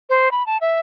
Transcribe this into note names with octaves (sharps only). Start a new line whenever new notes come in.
C5
B5
A5
E5